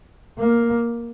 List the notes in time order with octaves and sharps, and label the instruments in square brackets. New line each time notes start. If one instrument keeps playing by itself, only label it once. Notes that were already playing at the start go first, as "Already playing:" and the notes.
[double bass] A#3